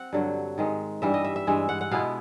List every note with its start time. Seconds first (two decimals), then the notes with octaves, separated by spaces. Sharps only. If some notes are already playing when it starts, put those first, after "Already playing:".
Already playing: C4 F#5
0.13 G2 D3 F#3
0.58 G#2 D#3 G#3
1.02 G2 E3 G3 E5
1.14 D#5
1.24 E5
1.36 E5
1.47 G2 E3 G#3
1.69 F#5
1.81 F#5
1.91 B2 G#3 B3 E4 F5